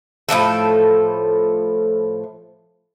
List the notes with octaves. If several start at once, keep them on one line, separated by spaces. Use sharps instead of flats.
A2 D3 F3 A4